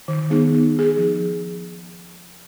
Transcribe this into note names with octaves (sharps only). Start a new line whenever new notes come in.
D#3
G#3 B3 D#4 G#4
B3
D#4 G#4
F3